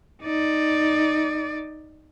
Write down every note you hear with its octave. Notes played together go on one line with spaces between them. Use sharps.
D#4 D5